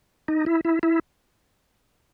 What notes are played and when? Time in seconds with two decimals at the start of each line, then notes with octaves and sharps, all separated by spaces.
0.28 D#4
0.46 E4
0.65 E4
0.83 E4